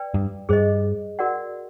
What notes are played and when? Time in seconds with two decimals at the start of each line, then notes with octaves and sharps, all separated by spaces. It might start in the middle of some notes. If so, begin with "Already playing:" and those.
Already playing: B4 D5 G5
0.14 G2
0.49 G2 G#4 C5 D#5
1.19 F#4 A#4 D5 F#5